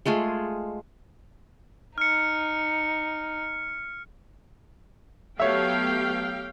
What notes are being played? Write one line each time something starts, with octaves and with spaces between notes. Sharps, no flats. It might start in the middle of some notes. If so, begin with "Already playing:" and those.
G#3 A3 F4 G#4
D#4 F6 C#7
F#3 A3 B3 G4 C#5 E5 F5 G5